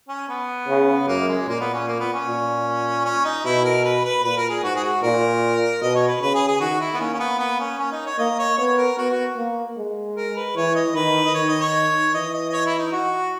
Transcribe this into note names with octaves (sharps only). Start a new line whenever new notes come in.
C#4
B3
C#3
F#2 A#3
G#3
A#2 A#3
B3
C#4
A#3
B3
C#4
A#2
C#4
D#4
B2 E4
A#4
B4
B4
A#2 B4
A#4
G#4
G#2 F#4
G#4
F#4
A#2 A#4
B2 D#5
C#5
B4
C#3 B4
G#4
G#4
D#3 F#4
E4
B3
A#3 C#4
C#4
B3
B3
C#4
C#4
D#4
C#5
A#3 D#5
C#5
B3 C#5
A#4
B3 F#4
F#4
A#3
G#3
A#4
B4
E3 C#5
D#5
D#3 B4
D#5
D#3 C#5
D#5
C#5
E3 D#5
D#5
D#5
C#5
E4
D#4
F#4